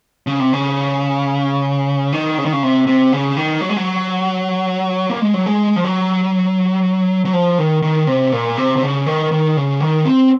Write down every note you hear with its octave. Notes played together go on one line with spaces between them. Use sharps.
C#3
C3
C#3
D#3
C#3
D#3
C#3
C3
C3
C#3
D#3
F#3
G#3
F#3
A#3
G#3
F#3
G#3
F3
F#3
F#3
F3
D#3
D#3
C3
A#2
C3
C3
C#3
D#3
D#3
C#3
D#3
C4